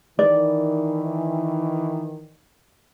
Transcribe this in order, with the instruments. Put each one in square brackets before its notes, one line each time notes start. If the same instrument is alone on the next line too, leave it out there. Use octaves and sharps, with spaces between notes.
[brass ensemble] D#3 E3 [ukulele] D5